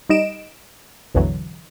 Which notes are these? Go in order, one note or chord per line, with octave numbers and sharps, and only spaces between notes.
G3 D#4 D#5 D7 E7
A1 E2 B2 D3 E3 F#3